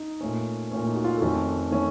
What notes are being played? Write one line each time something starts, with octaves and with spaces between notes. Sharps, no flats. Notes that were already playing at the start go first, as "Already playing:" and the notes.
Already playing: D#4
A#2 A3 C#4
A#2 A3 C#4
D#4
F#4
F4
A4
F2 D#3 A3 C#4 F#4
D#3 A3 C#4